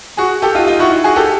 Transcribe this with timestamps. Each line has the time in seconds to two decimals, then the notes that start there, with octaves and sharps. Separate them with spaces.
0.17 F#4 G#4
0.42 G4 A4
0.55 D#4 F4
0.67 D#4 F4
0.79 E4 F#4
1.04 F#4 G#4
1.16 G4 A4